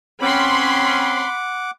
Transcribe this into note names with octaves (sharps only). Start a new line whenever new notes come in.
C4 C#4 F#5 B5 C6 D6